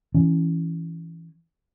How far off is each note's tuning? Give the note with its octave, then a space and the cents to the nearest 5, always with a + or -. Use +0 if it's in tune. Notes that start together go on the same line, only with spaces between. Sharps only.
E3 +0 C#4 +0